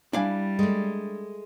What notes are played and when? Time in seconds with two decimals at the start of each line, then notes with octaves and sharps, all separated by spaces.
0.13 G3 D4 E4 F5 G#5
0.59 G#3 A3